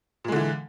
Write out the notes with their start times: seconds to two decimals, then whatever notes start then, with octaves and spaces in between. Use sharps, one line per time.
0.24 A#2
0.28 G#3
0.32 D3
0.36 E3